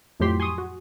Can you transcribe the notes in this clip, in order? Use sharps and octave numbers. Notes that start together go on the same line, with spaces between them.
F2 A2 F#3 G4 C6 B6
G#5 C6 C#6 D#6
F#4